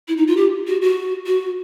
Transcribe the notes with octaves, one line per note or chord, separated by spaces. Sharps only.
E4
D#4
F4
G4
F#4
F#4
F#4